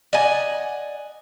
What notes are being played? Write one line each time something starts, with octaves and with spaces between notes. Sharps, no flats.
D5 D#5 F#5 G#5